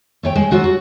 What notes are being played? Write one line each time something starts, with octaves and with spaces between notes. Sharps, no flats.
A3 C#5 G5
G#3
F#3 F4 F#4 F#5
F#4